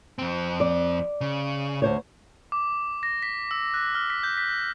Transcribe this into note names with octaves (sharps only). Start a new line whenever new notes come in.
F2 C4
D5
C#3
D2 C5 C#5
D6
A#6
B6
E6
F#6
F6
B6
G6
B6